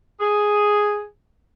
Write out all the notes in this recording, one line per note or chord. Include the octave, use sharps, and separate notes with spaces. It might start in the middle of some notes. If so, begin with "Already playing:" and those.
G#4